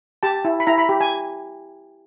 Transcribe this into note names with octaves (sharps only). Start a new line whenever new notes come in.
G4 A5
E4
B5
E4 A#5
B5
G4
G#5